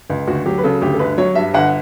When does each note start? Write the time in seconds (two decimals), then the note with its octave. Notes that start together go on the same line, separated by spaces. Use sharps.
0.10 C#2
0.27 D2 F#4
0.46 F#3 G4
0.58 B4
0.64 C#3 A4
0.82 D2 G4
0.94 A4
0.99 G1 B4
1.18 F#3 C#5
1.35 G2 E5
1.54 G1 F#5